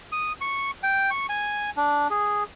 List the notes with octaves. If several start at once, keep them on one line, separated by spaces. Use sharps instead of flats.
D#6
C#6
G5
C#6
G#5
D4
G#4